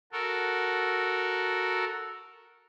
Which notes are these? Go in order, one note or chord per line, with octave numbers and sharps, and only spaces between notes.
F#4 A4 A#4